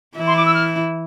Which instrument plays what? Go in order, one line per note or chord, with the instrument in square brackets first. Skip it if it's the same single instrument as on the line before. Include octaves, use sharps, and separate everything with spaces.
[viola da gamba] E3 E4
[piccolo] C6
D6
E6
F6